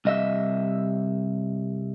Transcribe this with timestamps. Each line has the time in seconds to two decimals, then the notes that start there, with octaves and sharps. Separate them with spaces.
0.05 C2 D#5 E5